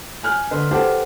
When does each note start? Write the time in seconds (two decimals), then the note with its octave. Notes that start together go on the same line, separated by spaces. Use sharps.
0.23 G#5 F6 F#6
0.51 D3 B4 D#5 C6
0.71 G4 A4 B4 C5 F#5 A5